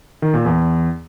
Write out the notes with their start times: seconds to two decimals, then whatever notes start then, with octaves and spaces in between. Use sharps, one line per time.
0.22 D#3
0.34 A#2
0.45 E2